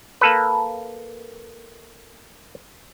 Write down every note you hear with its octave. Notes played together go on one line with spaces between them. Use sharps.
A#3 A4 B4